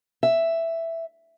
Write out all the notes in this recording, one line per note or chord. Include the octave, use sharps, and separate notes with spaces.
E5